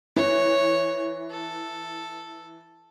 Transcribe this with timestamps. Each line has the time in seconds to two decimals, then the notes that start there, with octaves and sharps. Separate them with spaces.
0.16 E3 C#5
1.31 A4